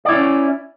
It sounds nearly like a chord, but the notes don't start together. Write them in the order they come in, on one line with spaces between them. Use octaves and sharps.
D5 E4 C#4